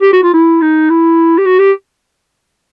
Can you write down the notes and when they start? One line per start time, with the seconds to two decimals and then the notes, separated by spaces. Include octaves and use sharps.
0.02 G4
0.13 F#4
0.23 F4
0.33 E4
0.62 D#4
0.90 E4
1.38 G4
1.46 F#4
1.59 G4